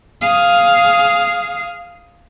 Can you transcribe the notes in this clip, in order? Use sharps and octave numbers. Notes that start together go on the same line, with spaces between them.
G#4 F5